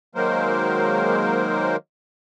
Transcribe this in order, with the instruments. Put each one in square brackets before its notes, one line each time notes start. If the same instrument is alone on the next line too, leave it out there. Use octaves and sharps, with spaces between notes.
[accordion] D#3 F#3 G#3 A#3 A#4 C5